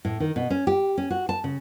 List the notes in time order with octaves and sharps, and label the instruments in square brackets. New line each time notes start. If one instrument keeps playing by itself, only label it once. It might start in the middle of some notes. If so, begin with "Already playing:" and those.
[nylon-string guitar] A2
D#3
B2
C#4
G4
C#4
F#4
A5
C#3